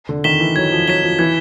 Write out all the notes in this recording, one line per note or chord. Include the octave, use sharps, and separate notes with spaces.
D3
D#3 B6 E7 G7
E3
F#3 G#6
F3
F#3 B6 E7 G7
F3
E3 G#6